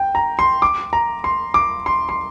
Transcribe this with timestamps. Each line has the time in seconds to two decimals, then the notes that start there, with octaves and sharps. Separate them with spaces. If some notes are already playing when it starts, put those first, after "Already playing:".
Already playing: G5
0.15 A#5
0.39 C6
0.62 D6
0.93 A#5
1.24 C6
1.54 D6
1.86 C6
2.09 C6